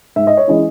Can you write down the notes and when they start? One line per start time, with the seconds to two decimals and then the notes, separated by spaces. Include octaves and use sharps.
0.16 G#2 E5
0.27 D#5
0.37 C#5
0.48 E3 G#3 C#4 E4 D#5